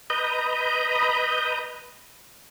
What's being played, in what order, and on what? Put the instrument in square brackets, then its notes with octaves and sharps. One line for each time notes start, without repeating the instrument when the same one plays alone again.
[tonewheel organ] B4 D#5 A#5 B5 D#6 G6